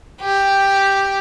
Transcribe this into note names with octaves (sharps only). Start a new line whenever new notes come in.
G4